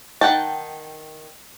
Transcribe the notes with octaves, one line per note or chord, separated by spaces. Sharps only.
D#3 F#5 G5 A5